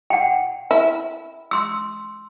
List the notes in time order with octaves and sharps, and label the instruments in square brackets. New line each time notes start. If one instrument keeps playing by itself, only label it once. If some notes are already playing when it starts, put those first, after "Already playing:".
[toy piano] F#5 G5
[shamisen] E4
[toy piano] C6 E6